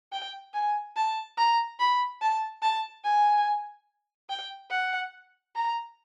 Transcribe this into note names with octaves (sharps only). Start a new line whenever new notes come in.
G5
G#5
A5
A#5
B5
A5
A5
G#5
G5
F#5
A#5